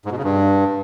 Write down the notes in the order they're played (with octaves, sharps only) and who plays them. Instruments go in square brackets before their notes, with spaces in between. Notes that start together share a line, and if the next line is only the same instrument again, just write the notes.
[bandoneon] G#2
B2
C#3
G2